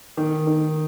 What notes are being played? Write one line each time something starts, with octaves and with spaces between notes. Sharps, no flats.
D#3
D#3